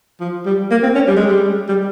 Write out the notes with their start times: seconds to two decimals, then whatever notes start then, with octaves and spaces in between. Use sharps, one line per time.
0.20 F3
0.46 G3
0.71 A#3
0.83 C4
0.95 C#4
1.08 G3
1.17 G#3
1.27 G3
1.68 G3